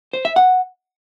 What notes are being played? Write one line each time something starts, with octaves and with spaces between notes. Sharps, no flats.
C5
E5
F#5